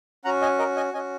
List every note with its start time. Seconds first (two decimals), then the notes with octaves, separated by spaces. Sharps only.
0.25 C#4 F#4 F#5 A#5
0.42 D#5 G#5
0.59 A#4 D#5
0.76 D#5 G#5
0.94 C#4 D#5 G#5
0.98 F#4